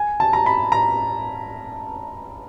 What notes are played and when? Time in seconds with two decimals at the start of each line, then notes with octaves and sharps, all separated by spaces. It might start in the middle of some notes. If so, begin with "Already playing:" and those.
Already playing: G#5
0.20 A5
0.33 A#5
0.46 B5
0.72 A#5